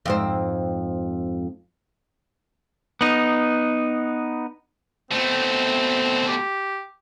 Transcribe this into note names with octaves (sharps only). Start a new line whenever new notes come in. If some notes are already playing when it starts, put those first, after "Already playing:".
F2 G#2 C4
B3 D#4
B2 A3 C4
G4